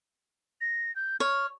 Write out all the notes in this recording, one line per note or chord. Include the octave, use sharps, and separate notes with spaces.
A#6
G6
C#5 F6